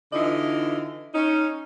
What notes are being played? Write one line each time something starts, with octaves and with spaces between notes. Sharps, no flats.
D3 E3 D#4 F4 D#5
C#4 D#4